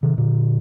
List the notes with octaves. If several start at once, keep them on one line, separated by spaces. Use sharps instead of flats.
C3 D#3
A#2 D3